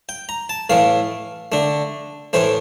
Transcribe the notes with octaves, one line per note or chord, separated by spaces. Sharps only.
G5
A#5
A5
A2 E3 A3 F5
D3 A3
A2 E3 A3 C5